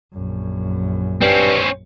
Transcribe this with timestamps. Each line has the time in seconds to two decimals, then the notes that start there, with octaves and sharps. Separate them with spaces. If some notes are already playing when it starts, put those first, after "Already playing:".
0.13 A#1 F#2
1.22 G2 C4 C#4